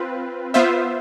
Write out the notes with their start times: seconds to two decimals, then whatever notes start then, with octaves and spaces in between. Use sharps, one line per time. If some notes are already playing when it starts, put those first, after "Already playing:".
Already playing: C4 F4 B4
0.54 B3 F4 C5 E5